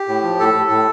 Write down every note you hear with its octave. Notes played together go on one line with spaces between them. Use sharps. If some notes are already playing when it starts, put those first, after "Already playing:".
Already playing: G4
A2
F3
A2 A4
A2
A2